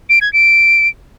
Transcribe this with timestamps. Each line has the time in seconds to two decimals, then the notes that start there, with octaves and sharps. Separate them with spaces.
0.09 D7
0.21 G#6
0.33 D7